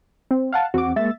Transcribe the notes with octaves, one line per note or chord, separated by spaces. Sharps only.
C4
F5 F#5 A5
E2 C4 F#4 D6
G#3 A#3 E5 A6